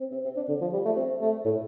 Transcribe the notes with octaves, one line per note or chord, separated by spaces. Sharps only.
C4
C4
C4
D4
D3
F3
G3
A3
C4
A3
A2